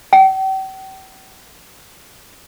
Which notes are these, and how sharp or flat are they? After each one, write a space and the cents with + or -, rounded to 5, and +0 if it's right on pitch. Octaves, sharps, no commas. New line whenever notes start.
G5 -40